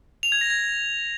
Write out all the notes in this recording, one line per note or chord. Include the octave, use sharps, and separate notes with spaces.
F7
G#6
A#6
G#6